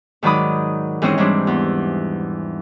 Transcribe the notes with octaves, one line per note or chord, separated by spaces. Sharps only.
G#2 D#3 F#3 D5 B5 D#6
G#2 E3 C4 C#4 D#5
G#2 E3 G3 C4 D4
E2